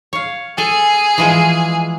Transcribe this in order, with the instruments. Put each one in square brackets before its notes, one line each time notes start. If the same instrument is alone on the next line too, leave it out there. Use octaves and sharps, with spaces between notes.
[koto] C#5 F5
[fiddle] G#4 [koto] A4 G#5
[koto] E3 F3 G#3